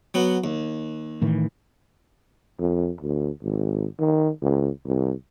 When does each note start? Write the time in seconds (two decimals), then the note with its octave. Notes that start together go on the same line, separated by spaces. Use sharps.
0.14 F#3 B3
0.44 D#2
1.22 A2 D#3 E3
2.59 F2
3.01 D2
3.42 G#1
3.98 D#3
4.42 C#2
4.86 C2